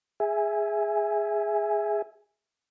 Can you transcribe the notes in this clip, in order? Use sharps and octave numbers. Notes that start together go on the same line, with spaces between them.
G#4 E5 G#5